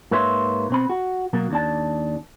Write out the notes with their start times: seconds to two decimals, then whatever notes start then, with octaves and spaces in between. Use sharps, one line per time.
0.11 G#2 A#3 B4 C#5 E5 C6
0.70 B2 C4 B5
0.90 F#4
1.33 B2 F#3 A#3
1.50 D#2 D4 A5